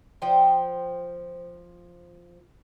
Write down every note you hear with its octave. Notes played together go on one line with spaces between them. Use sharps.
F3 C5 G5